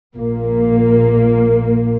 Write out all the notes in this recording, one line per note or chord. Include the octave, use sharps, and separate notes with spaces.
A#1 A#2 A#3